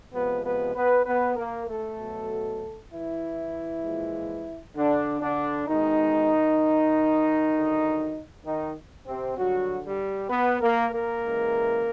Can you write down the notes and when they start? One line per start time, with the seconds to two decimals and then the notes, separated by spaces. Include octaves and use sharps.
0.13 C3 F3 G#3 B3 B4
0.44 B3 B4
0.75 B3 B4
1.05 B3 B4
1.36 A#3 A#4
1.67 A3 A4
1.98 B2 F#3
2.91 E3 E4
3.83 A#2 F3 G#3
4.76 D3 D4
5.21 D3 D4
5.67 B2 D#3 G#3 D#4
7.53 D3 F#3
8.45 D#3 D#4
9.07 C3 C4
9.37 D3 F#3 G3 F#4
9.84 G3 G4
10.30 B3 B4
10.61 A#3 A#4
10.92 A#3 A#4
11.22 C#3 E3 G#3